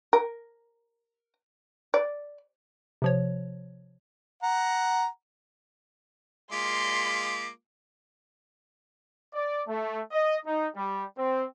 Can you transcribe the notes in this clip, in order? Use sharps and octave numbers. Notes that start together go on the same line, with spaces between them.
A#4
D5
C3 F3 C#5
F#5 A#5
G#3 A#3 F4 C6 D6 B6
D5
A3
D#5
D#4
G3
C4